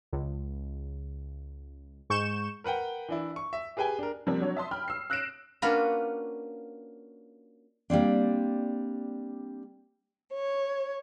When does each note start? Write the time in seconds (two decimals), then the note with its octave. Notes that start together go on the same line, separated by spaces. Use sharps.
0.12 C#2
2.10 G#2 C#6 G6 E7
2.64 A#4 B4 F#5 G5
3.09 E3 D4 E4
3.36 C#6
3.53 E5
3.77 G4 G#4 B4 G5 G#5
3.99 D4 A#4
4.27 C3 F3 G3 A#3 C4
4.40 F#3 D4 C#5
4.57 E5 A5 C6 D#6
4.71 G5 B5 F6
4.88 E6 C7
5.10 E6 F#6 A#6 C7 D7 E7
5.62 A#3 C#4 D4 F4 F#4 B4
7.90 G3 A#3 C4 D4
10.31 C#5